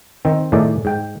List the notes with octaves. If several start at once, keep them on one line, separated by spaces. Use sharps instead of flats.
D#3 C4
A2 D#3 A3 G#4 D5
G#2 G5